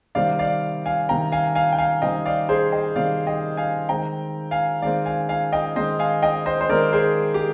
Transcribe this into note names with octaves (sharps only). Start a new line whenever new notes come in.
C3 D#3 G3 C4 D5 F5
D5 F5
F5 G#5
C3 D#3 G3 C4 G5 A#5
F5 G#5
F5 G#5
G5
F5 G#5
C3 D#3 G3 C4 D#5 G5
D5 F5
G#4 C5
D#5 G5
C3 D#3 G3 C4 D5 F5
D#5 G5
F5 G#5
D#3 G#3 C4 G5 A#5
F5 G#5
D#3 G#3 C4 D5 F5
F5 G#5
F5 G#5
D#5 G5
D#3 G#3 C4 C5 D#5
F5 G#5
D#5 G5
C5 D#5
C5
D#3 G#3 C4 A#4 D5
G#4 C5
G4